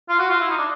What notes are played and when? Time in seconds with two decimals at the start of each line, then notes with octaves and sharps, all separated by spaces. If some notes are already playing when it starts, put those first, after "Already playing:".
0.09 F4
0.19 F#4
0.30 F4
0.40 E4
0.50 D#4
0.58 D4